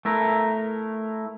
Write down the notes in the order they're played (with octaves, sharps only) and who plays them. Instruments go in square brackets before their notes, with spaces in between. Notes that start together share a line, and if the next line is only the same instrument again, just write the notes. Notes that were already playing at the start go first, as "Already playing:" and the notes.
[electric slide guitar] A3 E4 A#4